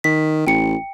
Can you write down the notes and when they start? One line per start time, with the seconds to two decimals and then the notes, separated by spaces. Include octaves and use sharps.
0.04 D#3 B6
0.47 A1 G5 C#7